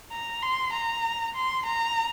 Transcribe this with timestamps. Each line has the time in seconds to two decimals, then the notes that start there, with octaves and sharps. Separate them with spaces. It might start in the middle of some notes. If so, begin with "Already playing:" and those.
0.11 A#5
0.42 C6
0.73 A#5
1.35 C6
1.66 A#5